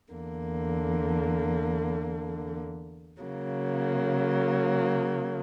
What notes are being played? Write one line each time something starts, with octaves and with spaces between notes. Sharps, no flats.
E2 D3 A#3
C#3 F#3 A#3